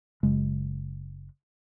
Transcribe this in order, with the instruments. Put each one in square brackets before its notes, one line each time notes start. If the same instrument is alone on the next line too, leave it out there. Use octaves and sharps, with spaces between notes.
[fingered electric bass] F#1 C#3 G#3